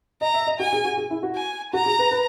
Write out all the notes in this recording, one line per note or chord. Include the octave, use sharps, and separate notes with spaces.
D#5 A#5
E5
D#5
F#4 G#5
G#4
F#4
G#4
E4
F#4
G#5
F#4 A#5
G#4
B4
B4